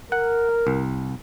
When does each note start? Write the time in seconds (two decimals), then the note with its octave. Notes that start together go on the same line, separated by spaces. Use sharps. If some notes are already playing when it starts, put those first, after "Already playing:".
0.12 A#4 F#5
0.67 C2